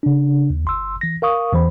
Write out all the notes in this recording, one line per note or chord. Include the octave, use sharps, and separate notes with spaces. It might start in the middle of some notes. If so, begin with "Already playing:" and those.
C#3 D4
D#2
G1 C6 E6
E3 A#6
A#4 F5 C#6 D#6
E2 E3 C5 B5